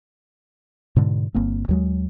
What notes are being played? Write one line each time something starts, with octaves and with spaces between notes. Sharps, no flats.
G#2 B2 D3
G1 A#3 C4
D#2 F#3 G#3